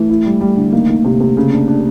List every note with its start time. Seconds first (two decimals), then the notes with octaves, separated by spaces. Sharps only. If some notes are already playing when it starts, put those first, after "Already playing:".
Already playing: E3 A3
0.09 E4
0.26 G3
0.41 G3
0.57 D3
0.73 D#3 A#3
0.89 D#3
1.05 C3
1.20 C3
1.37 C#3
1.52 D4
1.68 D4